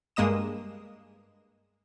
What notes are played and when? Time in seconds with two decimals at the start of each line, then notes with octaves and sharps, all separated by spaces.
0.16 G2 G#3 A#3 D#5 D#6 E7